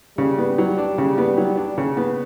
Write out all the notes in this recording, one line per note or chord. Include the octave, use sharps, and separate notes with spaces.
C#3 G3
B3
F#3
D4
C#3
B3
F#3
D4
C#3
B3